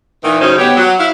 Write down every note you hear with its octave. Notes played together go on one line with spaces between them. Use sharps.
A#2 D#3 E3
A2 C#3 F#3 C#4 D#4 C5
B3 G4 C#5
F#3
E4 F5